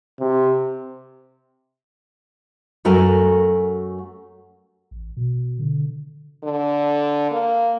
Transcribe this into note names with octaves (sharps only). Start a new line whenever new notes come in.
C3
F#2 A3 F#4 A#4 G#5
A1
B2
D3
D3
A#3